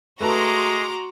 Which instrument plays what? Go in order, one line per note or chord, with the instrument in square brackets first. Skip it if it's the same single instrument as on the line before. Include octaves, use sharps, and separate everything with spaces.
[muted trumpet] G#3 [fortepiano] A3 B4 A5 [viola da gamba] F#4 [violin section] A#5 C6 D6